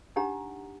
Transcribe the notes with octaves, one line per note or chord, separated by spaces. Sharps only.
D4 D#4 G4 F#5 A#5